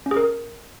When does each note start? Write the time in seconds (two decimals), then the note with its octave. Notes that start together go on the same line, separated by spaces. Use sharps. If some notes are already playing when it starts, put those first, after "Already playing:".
0.06 C#4
0.11 G#4
0.17 A#4